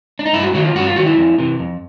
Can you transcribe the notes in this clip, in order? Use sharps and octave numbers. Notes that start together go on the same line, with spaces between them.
D4
D#4
G2 E4
F#4
D#3 F#3 F#4
F4
G2 F#4
F4
D#3 F#3 F#4
E4
F2
C3 E3
F2